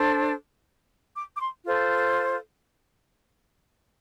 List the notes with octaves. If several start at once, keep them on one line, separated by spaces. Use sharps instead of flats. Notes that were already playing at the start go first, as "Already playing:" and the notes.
Already playing: D4 A4 C5
D6
D6
C6
F4 A4 C5